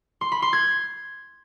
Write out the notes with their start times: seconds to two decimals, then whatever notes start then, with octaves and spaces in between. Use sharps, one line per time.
0.21 C6
0.32 B5
0.42 C6
0.53 G#6